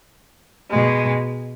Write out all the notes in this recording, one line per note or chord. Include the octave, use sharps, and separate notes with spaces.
B2 G#3